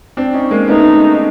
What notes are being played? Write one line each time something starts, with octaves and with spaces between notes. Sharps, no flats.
C4 D4
C#4 D#4
G#3 A#3
A3 B3 D#4